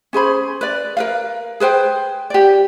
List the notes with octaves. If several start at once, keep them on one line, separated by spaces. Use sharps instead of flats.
C#4 G#4 C5 B5
B4 D5
A#4 B4 F5
G#4 B4 C5 G5
G4 D5